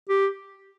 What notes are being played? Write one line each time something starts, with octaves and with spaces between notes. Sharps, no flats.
G4